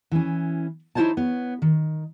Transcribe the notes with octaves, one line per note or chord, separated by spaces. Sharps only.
E3 C#4
D#4 E4 G4 C5 C#5 A5
B3 C#5
D#3